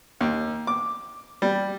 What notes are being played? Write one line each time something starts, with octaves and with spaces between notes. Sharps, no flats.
D#2
D6
G3